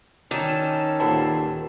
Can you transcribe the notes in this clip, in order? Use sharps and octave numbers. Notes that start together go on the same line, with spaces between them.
D#3 C#4 D#4 D5 A5 E6
D#2 A#2 B3 A4 C5